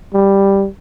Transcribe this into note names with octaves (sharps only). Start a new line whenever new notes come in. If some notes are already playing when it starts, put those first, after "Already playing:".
G3